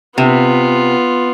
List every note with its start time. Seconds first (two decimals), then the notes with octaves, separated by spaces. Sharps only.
0.18 C3 B3 F4